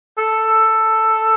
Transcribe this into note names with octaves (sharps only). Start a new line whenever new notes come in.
A4